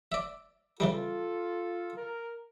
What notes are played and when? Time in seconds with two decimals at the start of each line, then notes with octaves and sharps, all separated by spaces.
0.12 D5 E5
0.80 C#3 E3 G3 F4 A4
1.95 A#4